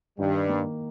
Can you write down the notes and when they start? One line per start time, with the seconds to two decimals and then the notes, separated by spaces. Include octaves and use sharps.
0.19 G2 D#3 G3
0.49 A#3